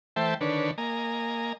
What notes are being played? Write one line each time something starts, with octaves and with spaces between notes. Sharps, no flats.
E3 A3 C5 E5 G5 A5
D3 D#3 D4 B4 C#5
A#3 D#5 G#5 A#5